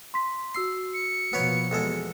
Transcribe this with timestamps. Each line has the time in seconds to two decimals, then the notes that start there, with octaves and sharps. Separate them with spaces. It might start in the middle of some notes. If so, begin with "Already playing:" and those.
0.14 C6 B6
0.54 F#4 C6 E6 C7
0.94 C#7
1.33 B2 F3 A#3 B3 B4 C#5
1.71 E2 G#3 A4